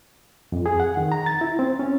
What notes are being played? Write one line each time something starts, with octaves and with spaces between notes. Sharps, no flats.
F2
G#4
F#5
D#3
A#5
A6
E4
C4
C#4